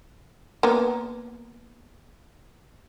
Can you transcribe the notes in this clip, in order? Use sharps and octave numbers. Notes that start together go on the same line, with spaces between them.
A#3 B3